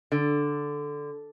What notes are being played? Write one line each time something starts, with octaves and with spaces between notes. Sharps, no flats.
D3